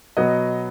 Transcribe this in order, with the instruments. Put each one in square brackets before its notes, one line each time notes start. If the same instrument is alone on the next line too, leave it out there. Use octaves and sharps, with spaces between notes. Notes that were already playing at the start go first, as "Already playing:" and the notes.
[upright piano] B2 F#3 B3 D#5